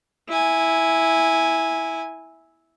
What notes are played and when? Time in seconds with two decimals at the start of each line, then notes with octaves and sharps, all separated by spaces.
0.29 E4 G#5